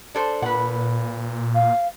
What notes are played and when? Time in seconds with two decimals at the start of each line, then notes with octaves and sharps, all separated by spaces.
0.15 D4 A4 C5
0.42 A#2 B4 F#5
1.55 F5